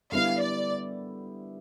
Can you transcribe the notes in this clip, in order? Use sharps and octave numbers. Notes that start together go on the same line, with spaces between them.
D3 G3 B3 E4 F5
D5